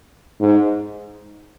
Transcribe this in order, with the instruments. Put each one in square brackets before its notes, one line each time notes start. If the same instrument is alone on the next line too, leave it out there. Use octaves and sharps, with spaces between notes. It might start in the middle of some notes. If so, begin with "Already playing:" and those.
[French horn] G#2